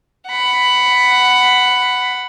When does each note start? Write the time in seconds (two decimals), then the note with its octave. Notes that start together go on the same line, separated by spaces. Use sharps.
0.27 F#5 B5